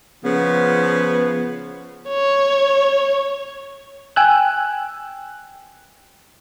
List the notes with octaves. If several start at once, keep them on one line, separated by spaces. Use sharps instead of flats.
C#3 F3 B3
C#5
G5 G#5 E6 F#6